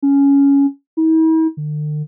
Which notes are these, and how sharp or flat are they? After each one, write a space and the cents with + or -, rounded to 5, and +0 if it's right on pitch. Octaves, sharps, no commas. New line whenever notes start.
C#4 +10
E4 -45
D3 +45